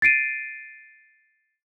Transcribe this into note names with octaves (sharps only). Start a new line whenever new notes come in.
A6 C7 D7 D#7